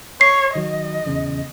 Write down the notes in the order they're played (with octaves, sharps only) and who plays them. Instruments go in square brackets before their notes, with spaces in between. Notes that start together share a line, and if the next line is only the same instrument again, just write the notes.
[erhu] C#5 [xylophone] C7
[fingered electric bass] D#3 F#3 [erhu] D#5
[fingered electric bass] D#1 E2 C#3